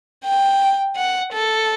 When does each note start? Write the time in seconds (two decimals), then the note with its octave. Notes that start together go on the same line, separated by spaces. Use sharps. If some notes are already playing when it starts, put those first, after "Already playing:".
0.24 G5
0.96 F#5
1.33 A4